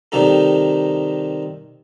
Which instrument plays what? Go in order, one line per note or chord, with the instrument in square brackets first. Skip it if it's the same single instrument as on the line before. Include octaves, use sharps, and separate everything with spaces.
[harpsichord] C3 D#3 G3 D#4 A4